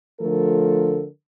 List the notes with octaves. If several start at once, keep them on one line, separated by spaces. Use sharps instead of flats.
D3 F3 A3 A4 A#4